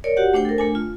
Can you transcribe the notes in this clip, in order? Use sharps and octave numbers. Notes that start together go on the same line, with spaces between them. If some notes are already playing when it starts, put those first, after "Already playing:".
A#4 C#5 D5
F#4 G4 F#5
A3 D4 C5 G5
A4 A#4
A3 D4 G#5
F4